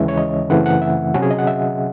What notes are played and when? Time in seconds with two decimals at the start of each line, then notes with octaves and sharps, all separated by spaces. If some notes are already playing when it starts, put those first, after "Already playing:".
Already playing: D#2 C#3 E3 G#3 C#4 E5
0.08 C#5
0.17 D#5
0.50 F#2 C#3 E3 A3 C4 F#5
0.66 F#5
0.82 E5
1.14 C3 F#3 C#4 F#4
1.22 G#4
1.30 D#5
1.39 F#5
1.47 E5